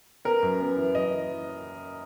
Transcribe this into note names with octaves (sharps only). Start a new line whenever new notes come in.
B3 A#4
F#2
B3
E3
F#2 D#5
E3